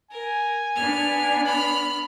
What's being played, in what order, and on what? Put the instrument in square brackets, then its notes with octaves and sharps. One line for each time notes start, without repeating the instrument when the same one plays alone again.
[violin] A#4 [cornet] G#5
[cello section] B3 D4 [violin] F6
[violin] B5 F6